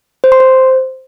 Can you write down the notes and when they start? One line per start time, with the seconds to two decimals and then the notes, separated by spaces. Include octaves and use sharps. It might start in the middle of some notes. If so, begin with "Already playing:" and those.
0.24 C5
0.32 C6
0.40 C5